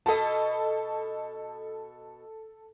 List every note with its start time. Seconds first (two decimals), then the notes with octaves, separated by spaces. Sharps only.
0.06 B2 A4 D#5 A5